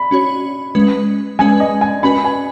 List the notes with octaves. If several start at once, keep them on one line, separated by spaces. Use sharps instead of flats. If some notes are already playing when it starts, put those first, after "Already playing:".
Already playing: B5
C#4 F#4 C#5
G#3 C#4 B4
G#3 C#4 B4 G#5
D#5
G#5
C#4 F#4 B4 B5
G#5